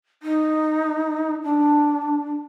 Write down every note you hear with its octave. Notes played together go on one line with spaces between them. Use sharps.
D#4
D4